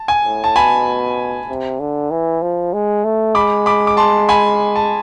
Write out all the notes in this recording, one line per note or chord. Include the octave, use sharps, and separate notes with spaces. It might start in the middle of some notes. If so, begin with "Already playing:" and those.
Already playing: A5
G#5
A2
A5
B2 G#5 B5
C3
D3
E3
F3
G#3
A3
G#3 B5 D6
B5 D6
D6
A5 C6
G#5 B5
A5